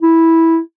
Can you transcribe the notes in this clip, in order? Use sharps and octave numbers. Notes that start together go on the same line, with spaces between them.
E4